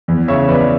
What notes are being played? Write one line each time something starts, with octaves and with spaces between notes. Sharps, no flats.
E2
C#3 C#5 E5
E2 B4 D5